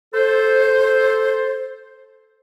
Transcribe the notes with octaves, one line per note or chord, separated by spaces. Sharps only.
A4 C5